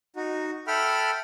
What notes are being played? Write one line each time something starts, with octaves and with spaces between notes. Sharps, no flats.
D#4 F#4
A4 E5 F#5 G5 B5 F6